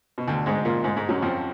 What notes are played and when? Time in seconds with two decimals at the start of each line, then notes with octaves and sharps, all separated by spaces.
0.18 B2
0.28 D2 D3
0.46 G#2 G#3
0.65 A#2 A#3
0.84 G#2 G#3
0.96 G#2 G#3
1.09 F#2 F#3
1.22 F2 F3